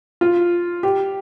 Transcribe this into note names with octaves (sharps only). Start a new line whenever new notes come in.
F4
G4